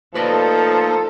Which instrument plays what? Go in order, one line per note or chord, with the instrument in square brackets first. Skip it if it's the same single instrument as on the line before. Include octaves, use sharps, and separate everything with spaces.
[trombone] F3 [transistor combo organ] A3 A#3 D#4 [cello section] A4 [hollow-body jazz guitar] B4 D5 D#5